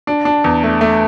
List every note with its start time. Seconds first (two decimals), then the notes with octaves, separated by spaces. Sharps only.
0.07 D4
0.25 D4
0.44 E2
0.63 A3
0.81 A3